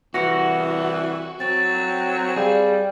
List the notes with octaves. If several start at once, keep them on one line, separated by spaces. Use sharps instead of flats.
C2 E3 F#4 A#6 C#7
F#3 C4 A6
G3 G#4 D5 F5 G5